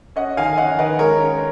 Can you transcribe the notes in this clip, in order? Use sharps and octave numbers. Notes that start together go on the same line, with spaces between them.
C#4 D#5 F#5
D#3 F5 G#5
C#4 D#5 F#5
D#3 B4 D#5
G#3 A#4 C#5
C#4